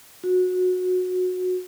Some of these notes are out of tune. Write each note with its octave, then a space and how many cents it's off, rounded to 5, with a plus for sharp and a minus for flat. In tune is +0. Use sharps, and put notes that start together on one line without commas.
F#4 -20